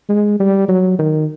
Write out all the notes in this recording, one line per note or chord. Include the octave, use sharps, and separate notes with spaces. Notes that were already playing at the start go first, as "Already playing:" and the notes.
G#3
G3
F#3
D#3